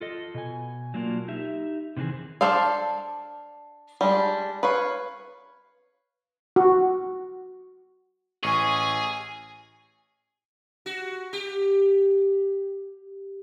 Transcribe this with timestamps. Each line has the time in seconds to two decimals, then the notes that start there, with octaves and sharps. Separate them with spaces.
0.01 F4 A4 D#5
0.34 B2 G#5
0.94 F#3 A#3 D4 F4 A#4
1.28 D#4 G4 E5
1.97 C3 D#3 E3 C4 G#4
2.41 D4 A4 C5 D5 F5
4.01 G3 G#3 D4
4.63 B4 C#5 F5
6.56 F#4
8.43 A1 G#4 G#5 C#6 C#7 D#7
10.86 F#4
11.33 G4